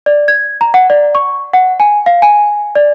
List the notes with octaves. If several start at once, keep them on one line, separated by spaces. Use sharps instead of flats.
D5
G#6
A#5
F#5
D5
C#6
F#5
G#5
F5
G#5
D5